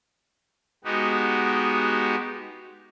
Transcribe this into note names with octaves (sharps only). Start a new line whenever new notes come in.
G#3 B3 D#4 F#4 G4